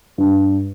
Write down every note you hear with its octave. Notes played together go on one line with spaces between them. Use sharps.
G2